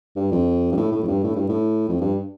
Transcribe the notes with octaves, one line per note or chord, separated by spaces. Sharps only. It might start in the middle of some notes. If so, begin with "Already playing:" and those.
G2
F2
G2
A2
A2
F2
G2
A2
G2
A2
F2
G2